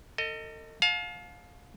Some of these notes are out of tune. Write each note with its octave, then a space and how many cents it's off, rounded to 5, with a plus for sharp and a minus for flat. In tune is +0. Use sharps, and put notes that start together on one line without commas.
A4 +40 D#5 +0
F5 +25 A5 -35